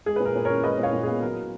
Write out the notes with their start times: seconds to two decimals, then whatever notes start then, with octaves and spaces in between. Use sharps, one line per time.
0.06 G#3 G#4
0.16 A#2 B4
0.25 A#4
0.36 A#2
0.45 C#4 A#4 C#5
0.64 G#3 B4 D#5
0.78 A#2 C#5 F5
0.93 A#2
1.03 B3 G#4
1.22 F#3 A#4